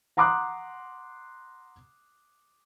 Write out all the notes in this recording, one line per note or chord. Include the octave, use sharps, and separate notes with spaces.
F#5 A#5 C6 D6 D#6 F#6